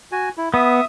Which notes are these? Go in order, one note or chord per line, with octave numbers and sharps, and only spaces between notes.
F#4 G#5
E4
B3 E5 D#6